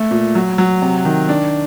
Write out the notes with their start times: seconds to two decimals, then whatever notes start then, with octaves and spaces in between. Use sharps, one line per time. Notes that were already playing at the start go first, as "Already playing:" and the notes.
Already playing: A3
0.11 A#2
0.35 F#3
0.58 F#3
0.82 C3
1.05 D#3
1.29 D4